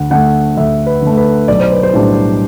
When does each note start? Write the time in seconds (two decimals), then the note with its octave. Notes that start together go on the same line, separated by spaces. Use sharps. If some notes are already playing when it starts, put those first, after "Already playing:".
Already playing: D2 F#5
0.10 D3 A3 F#5
0.57 D2 E5
0.86 B4
1.02 D3
1.07 A3
1.17 B4
1.48 B1 D5
1.60 C5
1.72 B4
1.83 C5
1.93 A2 G3 D4